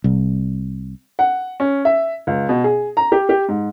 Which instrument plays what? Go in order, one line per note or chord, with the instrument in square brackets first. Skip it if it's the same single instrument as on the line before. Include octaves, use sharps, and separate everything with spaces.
[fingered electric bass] C2
[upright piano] F#5
C#4
E5
C#2
B2
G#4
A#5
G4
G4
G#2